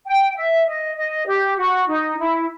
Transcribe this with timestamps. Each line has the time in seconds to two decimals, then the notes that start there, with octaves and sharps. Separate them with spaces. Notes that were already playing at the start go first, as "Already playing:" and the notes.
0.05 G5
0.37 E5
0.67 D#5
0.96 D#5
1.27 G4
1.57 F#4
1.87 D#4
2.18 E4